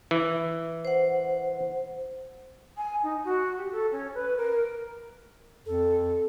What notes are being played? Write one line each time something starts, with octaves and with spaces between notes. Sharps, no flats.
E3
C5 F#5
G#5
D#4
F#4
G4
A4
C#4
B4
A#4
F2 A4